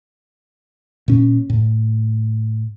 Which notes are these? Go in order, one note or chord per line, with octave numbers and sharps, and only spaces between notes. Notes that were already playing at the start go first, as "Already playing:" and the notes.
A#2 C#4
A2